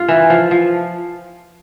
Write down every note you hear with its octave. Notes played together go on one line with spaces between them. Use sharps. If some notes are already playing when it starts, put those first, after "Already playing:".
Already playing: G2 F4
E3
F3
F3